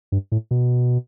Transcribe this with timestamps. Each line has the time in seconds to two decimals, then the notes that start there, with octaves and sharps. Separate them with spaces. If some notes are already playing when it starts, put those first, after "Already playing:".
0.12 G2
0.32 A2
0.51 B2